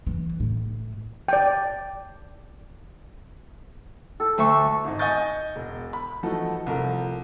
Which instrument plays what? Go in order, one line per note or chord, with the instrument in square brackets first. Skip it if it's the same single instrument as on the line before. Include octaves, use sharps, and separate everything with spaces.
[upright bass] E3
A2
[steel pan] D5 G5
[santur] A4
[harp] D2 E5 C#6
[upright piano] G#1 D#4
D#5 G#5 C#6 G6 A6
E1
B5
E3 F3 A3 D#4 F#4 A4
C2 F3 A3 A#4